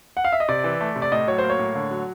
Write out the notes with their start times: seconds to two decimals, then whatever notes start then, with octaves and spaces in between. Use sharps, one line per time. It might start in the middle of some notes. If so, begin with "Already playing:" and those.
0.17 F#5
0.25 F5
0.32 E5
0.40 D#5
0.49 C3 D5
0.64 E3
0.81 A3
0.96 C3
1.02 D5
1.12 A2 D#5
1.27 F#3 C#5
1.38 C5
1.44 A#3
1.50 C#5
1.59 A2
1.75 D3
1.91 F#3